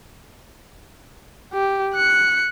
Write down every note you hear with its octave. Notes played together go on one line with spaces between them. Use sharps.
G4
F#6 C#7